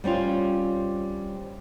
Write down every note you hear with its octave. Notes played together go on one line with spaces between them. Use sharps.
G3 C4 C#4 F4